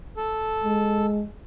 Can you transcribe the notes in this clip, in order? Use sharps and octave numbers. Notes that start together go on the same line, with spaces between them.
A4
G#3